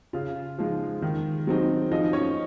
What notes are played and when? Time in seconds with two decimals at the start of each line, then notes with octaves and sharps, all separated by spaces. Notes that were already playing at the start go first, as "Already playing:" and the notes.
0.13 C#3 F4 F5
0.59 F3 G#3 D#4
1.02 D#3
1.47 F#3 C4 D#4
1.91 F3 D#4 D#5
2.13 C#4 C#5